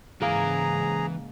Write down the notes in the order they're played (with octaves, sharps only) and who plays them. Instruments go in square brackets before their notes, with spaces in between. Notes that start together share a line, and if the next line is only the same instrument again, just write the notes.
[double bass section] G#2 C#3 [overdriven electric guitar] E3 [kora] A#3 [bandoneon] G#4 A#5